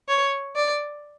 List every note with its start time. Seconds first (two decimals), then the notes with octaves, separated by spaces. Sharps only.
0.08 C#5
0.56 D5